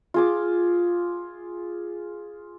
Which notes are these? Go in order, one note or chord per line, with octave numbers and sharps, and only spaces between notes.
F4 G#4 D6